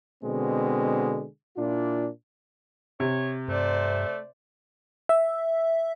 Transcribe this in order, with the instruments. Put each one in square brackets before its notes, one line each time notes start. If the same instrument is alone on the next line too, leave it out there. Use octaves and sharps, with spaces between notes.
[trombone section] B2 D3 G#3 C4
A#2 D4 E4 F4
[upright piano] C3 [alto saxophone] C#5
[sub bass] G2 [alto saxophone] A3 [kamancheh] C5 D5
[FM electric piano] E5